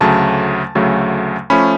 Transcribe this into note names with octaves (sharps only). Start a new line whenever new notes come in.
D2 C#3 F#3 A3 A5
D2 C#3 F#3 A3
F3 A3 C#4 B5